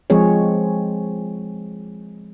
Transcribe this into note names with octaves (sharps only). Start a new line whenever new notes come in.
F3 G#3 C4 G#4 C#5